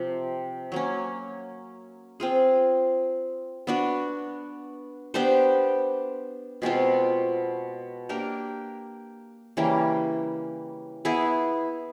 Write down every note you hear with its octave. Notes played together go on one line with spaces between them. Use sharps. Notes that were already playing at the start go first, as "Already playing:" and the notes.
Already playing: C3 F3 C4
F#3 A#3 C#4
C4 F4 G#4
B3 D4 F#4
B3 D4 G4 C5
B2 G#3 C4 F4
A#3 D4 G4 A#4
C#3 E3 G3 A#3
B3 E4 G#4